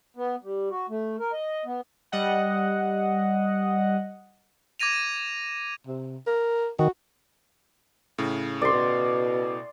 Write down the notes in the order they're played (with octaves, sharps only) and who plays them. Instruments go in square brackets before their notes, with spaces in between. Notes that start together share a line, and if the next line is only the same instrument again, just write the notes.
[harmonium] B3
G3
F#4
A3
A#4
D#5
B3
[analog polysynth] G3 D#5 F#5
[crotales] D6 G#6 A#6 D#7 F7
[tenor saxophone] C3
A#4
[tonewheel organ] D#3 [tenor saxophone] F#4
[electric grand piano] A2 C#3
[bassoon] C2 [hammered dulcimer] D5 C6
[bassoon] B2